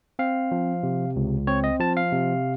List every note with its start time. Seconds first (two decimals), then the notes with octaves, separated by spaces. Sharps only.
0.19 C4 F5
0.51 F3
0.83 C3
1.16 C#2
1.47 C4 C#5
1.64 D#5
1.80 F3 A5
1.97 F5
2.12 C3